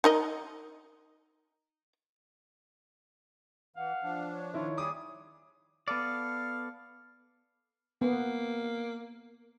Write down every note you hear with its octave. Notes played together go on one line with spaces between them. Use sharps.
D#4 A#4 D#5
E3 F5 F#5
F3 D4
C#5
D#3 E4 F4 C#5
G3 G#4 D6 D#6
B3 A4 D5 F5
A#3 B3